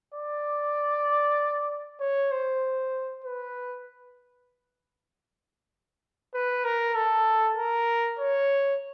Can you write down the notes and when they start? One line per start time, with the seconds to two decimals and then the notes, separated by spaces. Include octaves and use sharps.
0.14 D5
2.01 C#5
2.31 C5
3.25 B4
6.34 B4
6.65 A#4
6.95 A4
7.57 A#4
8.19 C#5